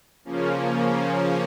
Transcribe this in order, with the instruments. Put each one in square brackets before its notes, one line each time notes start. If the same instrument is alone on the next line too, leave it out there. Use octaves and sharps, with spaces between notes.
[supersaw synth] C#3 F3 A#3 C#4